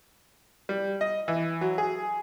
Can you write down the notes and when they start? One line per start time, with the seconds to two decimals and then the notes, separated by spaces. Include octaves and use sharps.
0.69 G3
1.01 D#5
1.28 E3
1.61 F#3
1.78 G#4